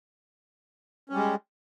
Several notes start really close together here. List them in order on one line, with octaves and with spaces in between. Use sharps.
C#4 G3 G#3